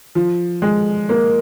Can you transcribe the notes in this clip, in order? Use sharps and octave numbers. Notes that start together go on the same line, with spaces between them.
F3
G#3
A#3